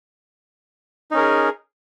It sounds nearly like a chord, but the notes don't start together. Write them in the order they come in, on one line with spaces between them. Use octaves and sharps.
D#4 C#4 A#4 G#4